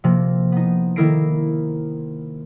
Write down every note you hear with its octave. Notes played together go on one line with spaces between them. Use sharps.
C3 F3 A#3
B3 D#4
D#3 A#3 E4 A#4 C7 D7